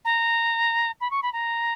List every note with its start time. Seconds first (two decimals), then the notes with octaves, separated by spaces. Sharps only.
0.05 A#5
1.00 B5
1.10 C#6
1.22 B5
1.32 A#5